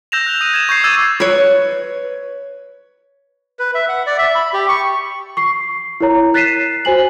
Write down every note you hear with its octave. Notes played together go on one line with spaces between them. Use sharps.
E6 G6 A#6 E7 F7
F#6
D#6 D#7
G#6 E7
C#6 G6 G#6 C7
D6 E6 G#6 A6 D#7 E7
B4 C#5
B4
E5
F#5
D5
E5
B5
G4
C#6
C#6 C7
E4 A#4 C#5 A#5
F#6 A6 B6 C7 D#7 E7
F#4 C5 G#5 F#7